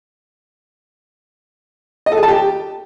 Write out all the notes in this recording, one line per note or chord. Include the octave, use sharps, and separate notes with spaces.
D#5
A4
G#4
A5
G4